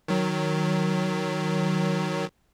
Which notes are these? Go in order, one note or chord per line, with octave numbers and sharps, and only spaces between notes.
D#3 F#3